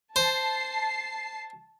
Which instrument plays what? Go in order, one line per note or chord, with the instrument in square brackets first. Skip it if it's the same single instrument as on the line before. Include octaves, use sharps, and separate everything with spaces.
[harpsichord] C5 [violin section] A5 C7